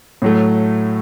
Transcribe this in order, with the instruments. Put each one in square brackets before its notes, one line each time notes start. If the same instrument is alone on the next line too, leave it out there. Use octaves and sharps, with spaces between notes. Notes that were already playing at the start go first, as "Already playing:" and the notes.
[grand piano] A2 F#3 A3